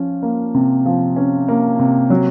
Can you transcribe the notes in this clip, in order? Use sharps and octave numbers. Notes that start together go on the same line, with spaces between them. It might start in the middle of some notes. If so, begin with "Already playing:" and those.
Already playing: F3 C#4
A#3
C3
F3
C#4
A#3
C3
F#3